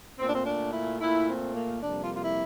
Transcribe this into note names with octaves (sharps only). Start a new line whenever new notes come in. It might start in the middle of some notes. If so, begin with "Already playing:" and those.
A#2 A3 C4
D4
C4
D4
E4
A#2 A3 E4
C4
A#3
F2 C3 G3 A#3 D4
F4
F4
E4